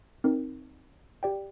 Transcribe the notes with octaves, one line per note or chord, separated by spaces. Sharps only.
C4 D#4 A#4
G4 D5 G5